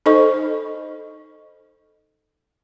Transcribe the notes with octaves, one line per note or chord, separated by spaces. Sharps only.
D#4 A4 C5 D#5 C#6